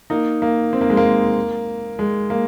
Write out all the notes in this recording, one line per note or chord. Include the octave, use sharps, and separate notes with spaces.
A#3 D#4
A#3
C4
A#3
G#3
A#3
G#3
A#3